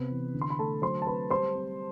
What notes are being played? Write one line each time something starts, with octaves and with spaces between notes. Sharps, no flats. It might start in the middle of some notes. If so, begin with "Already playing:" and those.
Already playing: C3 B3 C4 B4
E3
D3
C6
B5
A3 A4 A5
F#3 C5 C6
A5
C4 B4 B5
G3 C5 C6
C4